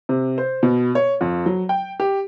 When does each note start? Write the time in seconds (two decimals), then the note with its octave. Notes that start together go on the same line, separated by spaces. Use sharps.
0.09 C3
0.38 C5
0.63 B2
0.95 C#5
1.21 F2
1.46 F#3
1.69 G5
2.00 G4